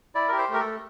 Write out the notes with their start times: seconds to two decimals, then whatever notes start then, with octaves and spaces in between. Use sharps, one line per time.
0.15 E4 D5
0.28 G4 A#4
0.38 C5
0.48 A3
0.54 A#4
0.60 A3 A4